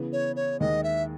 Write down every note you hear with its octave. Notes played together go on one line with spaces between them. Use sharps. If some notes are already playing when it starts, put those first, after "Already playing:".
Already playing: C#3 E3 B3
C#5
C#5
D#2 D#3 G#3 D#5
E5